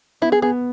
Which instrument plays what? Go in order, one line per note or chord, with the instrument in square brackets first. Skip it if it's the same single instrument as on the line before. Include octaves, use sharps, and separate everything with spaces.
[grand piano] B3 [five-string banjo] E4
[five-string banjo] G#4
[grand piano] B3 [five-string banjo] G#4